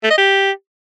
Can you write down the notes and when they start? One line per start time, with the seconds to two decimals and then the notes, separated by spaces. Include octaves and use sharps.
0.03 A3
0.10 D#5
0.17 G4